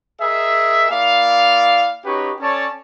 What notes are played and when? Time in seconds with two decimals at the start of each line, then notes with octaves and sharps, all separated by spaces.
0.21 G#4 A#4 D#5 E5
0.91 A#3 E4 D5 F5
2.05 C#4 D#4 F#4 G4 B4 C#5
2.40 C#4 A4 C#5 D5 A5